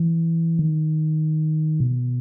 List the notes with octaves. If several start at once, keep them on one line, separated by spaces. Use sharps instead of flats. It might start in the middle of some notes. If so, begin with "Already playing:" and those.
Already playing: E3
D#3
B2